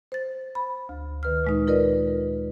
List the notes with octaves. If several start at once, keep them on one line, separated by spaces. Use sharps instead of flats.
C5 A6
B5
D2
D#3 B4 F6
A#2 G#3 D#4
F4 A#4 B4 D5 D#5